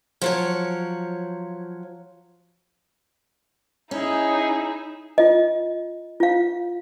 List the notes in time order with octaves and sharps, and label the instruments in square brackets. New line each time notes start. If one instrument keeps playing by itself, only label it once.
[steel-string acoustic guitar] F3 F#3 C#5
[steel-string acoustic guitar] C#4 [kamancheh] D#4 [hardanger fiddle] E4 G#4
[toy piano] F4 D#5
F4 F5